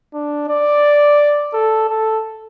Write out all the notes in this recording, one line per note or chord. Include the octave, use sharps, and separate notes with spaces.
D4
D5
A4
A4